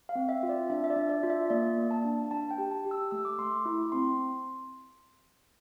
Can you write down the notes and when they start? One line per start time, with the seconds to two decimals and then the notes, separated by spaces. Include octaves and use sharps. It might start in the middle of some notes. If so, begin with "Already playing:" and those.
0.09 F5
0.15 C4
0.29 E5
0.43 F4
0.49 D5
0.70 D4 E5
0.84 E5
0.90 D5
0.96 D4
1.09 D5
1.23 F4
1.30 E5
1.50 A#3 D5
1.78 A#3
1.91 A5
2.04 D4
2.31 D4 A5
2.51 G5
2.58 G4
2.71 A5
2.85 G4
2.91 E6
3.11 A3 E6
3.25 D6
3.38 A3 C6
3.52 D6
3.65 E4
3.92 C4 C6